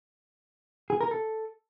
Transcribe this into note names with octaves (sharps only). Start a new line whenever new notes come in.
G#4
A#4
A4